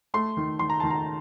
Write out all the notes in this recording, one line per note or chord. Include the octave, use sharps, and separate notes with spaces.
A3 C6
D#3
D#3 C6
A#5
D#3 A5
A#5